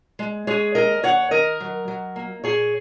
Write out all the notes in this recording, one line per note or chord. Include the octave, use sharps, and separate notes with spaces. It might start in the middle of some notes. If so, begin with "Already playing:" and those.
G#3
G#3 G#4 C#5
D#2 A#4 D#5
D#2 C#5 F#5
D#3 A#4 D#5
F#3
F#3
A#3
A#2 G#4 C#5